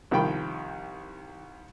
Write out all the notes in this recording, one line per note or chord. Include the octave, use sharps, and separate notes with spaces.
C2 D#3 F3 G5 B5